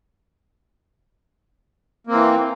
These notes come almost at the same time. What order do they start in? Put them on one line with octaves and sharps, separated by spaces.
A#3 C4 E3